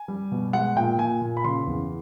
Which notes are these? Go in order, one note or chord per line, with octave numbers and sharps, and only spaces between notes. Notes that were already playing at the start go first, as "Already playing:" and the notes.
Already playing: G#5
G3
B2
G#3 F#5
A#2 G5
A#2 G#5
A#2
B5
C#3 C6
E2